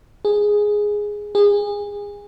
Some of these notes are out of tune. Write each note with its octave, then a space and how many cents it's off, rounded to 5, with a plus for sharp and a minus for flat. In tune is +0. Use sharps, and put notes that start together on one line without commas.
G#4 +0
G#4 -25